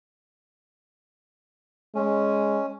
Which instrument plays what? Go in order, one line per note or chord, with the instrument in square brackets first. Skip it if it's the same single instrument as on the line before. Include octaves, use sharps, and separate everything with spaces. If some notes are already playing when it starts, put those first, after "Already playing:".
[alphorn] G#3 [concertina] C#4